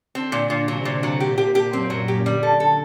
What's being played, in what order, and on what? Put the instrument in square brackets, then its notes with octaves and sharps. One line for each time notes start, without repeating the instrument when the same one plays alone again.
[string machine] D3 D4 [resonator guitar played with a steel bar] C4
[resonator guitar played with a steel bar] A#2
A#2
[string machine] C3 C4 [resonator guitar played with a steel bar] F#3
[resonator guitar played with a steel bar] A#2
F#3
[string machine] A#2 A#3 [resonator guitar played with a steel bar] G4
[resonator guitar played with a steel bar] G4
G4
[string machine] F#2 F#3 [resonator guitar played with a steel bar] C4
[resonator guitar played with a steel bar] F#3
G4
[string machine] D3 [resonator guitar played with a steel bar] G3
[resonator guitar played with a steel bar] A4
A4